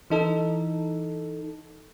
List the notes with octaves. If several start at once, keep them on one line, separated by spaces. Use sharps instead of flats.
E3 D#4 A4